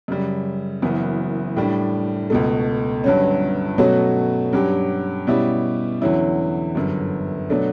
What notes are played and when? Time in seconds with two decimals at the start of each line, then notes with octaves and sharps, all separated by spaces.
0.08 F#2 C#3 G3
0.82 F#1 F#2 E3 B3
1.56 A2 G3 D4
2.30 C#2 B2 A3
3.04 G1 G2 F#3 C#4
3.78 B2 F#3 A3 C#4 F#4
4.53 G2 F#3 C#4 G4
5.27 B2 G3 C#4 E4 G4
6.02 E2 D3 F#3 C#4 E4
6.75 G1 F#2 D3
7.50 B2 F#3 A3 D4